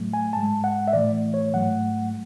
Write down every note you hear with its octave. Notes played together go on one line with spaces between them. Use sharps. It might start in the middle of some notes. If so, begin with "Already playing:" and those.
Already playing: A2 F#3 A3
G#5
G#2 G#3 A5
F#5
E5
A2 E3 A3 D5
C#5
G#2 F#3 A3 F#5